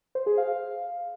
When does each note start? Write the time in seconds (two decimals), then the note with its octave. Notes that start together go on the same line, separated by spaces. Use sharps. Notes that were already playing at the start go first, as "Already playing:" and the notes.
0.15 C5
0.26 G#4
0.38 F5